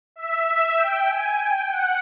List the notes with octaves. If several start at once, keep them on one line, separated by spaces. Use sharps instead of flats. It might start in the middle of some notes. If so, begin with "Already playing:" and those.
E5
E5
G5
G#5
G5
F#5